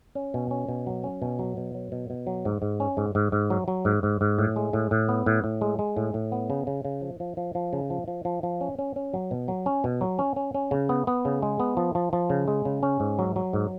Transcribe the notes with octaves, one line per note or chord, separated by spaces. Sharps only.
C#4
B2
C#4
B2
F#3
C#4
B2
F#3
B2
F#3
B2
B2
F#3
G#2
G#2
C#4
G#2
G#2
G#2
F#3
F#3
G#2
G#2
G#2
A2
G#3
A2
A2
B3
A2
A2
G#3
G#3
A2
A2
B3
C#3
C#3
C#3
F3
F3
F3
F3
C#3
F3
F3
F3
F3
C#4
C#4
C#4
F#3
B2
F#3
C#4
B2
F#3
C#4
C#4
C#4
C#3
B3
B3
C#3
G#3
B3
F3
F3
F3
C#3
G#3
C#3
C#4
G#2
F#3
F#3
G#2